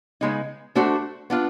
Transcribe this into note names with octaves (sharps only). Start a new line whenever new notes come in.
C#3 F3 G#3 B3 D#4
A3 D4 F#4 A4 C5
B3 D4 F4